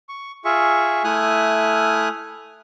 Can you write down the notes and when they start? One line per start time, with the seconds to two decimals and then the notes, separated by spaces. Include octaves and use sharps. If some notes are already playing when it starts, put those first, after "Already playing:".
0.09 C#6
0.45 F4 G#4 E5 C#6
1.04 A3 E4 G#5 D#6 F6 F#6